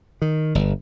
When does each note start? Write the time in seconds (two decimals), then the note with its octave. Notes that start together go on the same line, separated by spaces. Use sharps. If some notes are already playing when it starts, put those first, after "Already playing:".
0.22 D#3
0.55 G1